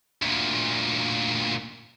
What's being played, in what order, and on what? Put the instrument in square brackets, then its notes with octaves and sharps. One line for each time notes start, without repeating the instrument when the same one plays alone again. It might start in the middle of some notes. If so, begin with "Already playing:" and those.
[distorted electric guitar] D2 A#2